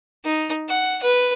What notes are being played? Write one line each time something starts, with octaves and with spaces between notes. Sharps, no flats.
D#4
F#5
B4